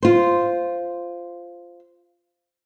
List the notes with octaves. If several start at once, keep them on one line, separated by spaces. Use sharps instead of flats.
F4 C5